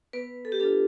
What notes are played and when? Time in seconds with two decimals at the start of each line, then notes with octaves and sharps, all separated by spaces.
0.13 B3 B4
0.45 A4
0.52 G4
0.60 D4 F4 A4